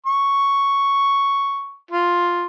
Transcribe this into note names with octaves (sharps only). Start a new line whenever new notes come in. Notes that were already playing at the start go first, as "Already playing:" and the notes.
C#6
F4